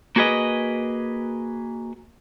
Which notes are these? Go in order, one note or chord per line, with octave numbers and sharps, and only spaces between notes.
A#3 F#4 G#4 B4 D#5